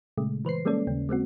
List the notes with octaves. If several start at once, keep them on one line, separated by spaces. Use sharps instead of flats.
A#2 C#3 G#3 A3
E3 B4 C5 C7
G3 G#3 A#3 C#4 A4 D5
D#2 C#3 C#4
G#3 A#3 C4 F#4